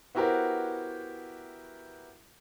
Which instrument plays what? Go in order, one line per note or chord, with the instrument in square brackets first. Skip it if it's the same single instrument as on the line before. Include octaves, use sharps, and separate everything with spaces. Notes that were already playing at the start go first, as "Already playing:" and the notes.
[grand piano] B3 E4 F#4 G4 A#4 C5